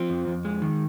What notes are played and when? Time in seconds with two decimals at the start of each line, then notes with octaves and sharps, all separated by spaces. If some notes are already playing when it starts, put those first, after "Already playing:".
Already playing: F3 C4
0.10 F2
0.28 F2
0.45 G#3
0.62 D#3